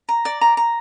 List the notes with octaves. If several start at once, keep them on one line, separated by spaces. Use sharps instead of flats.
A#5
D5
A#5
A#5